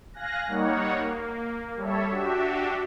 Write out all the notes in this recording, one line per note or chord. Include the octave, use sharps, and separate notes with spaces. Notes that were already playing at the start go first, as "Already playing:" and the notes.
F5 G#5 F#6 A#6
G3 A#3 D#4 C#5 F#5
A#3
G3 A4 C#5 E5
D4 F#4 G4 E5